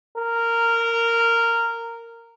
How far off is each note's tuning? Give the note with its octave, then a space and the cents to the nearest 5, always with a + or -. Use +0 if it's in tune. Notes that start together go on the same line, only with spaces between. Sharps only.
A#4 -10